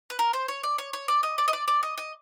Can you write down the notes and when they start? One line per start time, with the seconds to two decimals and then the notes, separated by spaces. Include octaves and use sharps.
0.10 B4
0.19 A#4
0.33 C5
0.48 C#5
0.63 D5
0.78 C#5
0.93 C#5
1.08 D5
1.23 D#5
1.38 D5
1.48 D#5
1.53 D5
1.68 D5
1.83 D#5
1.98 D#5